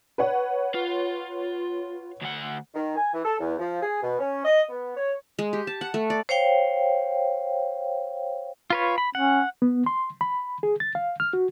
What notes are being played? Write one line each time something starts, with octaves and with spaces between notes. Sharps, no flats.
B4 C#5 F#5
F4
D2 F#5
D#3
G#5
E3
A4
E2
F3
G#4
B2
C#4
D#5
B3
C#5
G#3
G4
A5
F#5
A3
D5
C5 C#5 F5 G5
F4 B4 C#5
B5
C#4 F#5
B3
C6
B5
G#4
A6
F5
F6
F#4